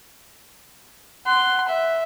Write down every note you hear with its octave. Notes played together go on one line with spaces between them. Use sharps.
F#5 C6
E5